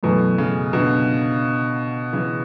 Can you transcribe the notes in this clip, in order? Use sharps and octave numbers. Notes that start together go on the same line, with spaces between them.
F#2 B2 E3 A3
C#3
B2 D3
C#3 E3